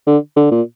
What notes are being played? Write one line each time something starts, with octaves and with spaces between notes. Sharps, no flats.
D3
D3
A#2